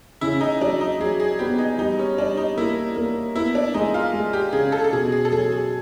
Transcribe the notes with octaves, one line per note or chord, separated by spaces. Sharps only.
C#3 E4
D#4
F#3 D4
D#4
F#3 G#4
G#4
B3 G4
D#4
G3 D#4
C#4
G3 D4
D#4
A#3 E4
A#3
B3 E4
D4
G#3 D#4
F4
G#3
G4
C#3 G#4
A4
A4
B2 G#4
G#4
A4
F#3 G#4
G#4